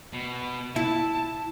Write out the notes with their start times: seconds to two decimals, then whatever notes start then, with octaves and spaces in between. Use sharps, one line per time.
0.13 B2
0.76 E4 A5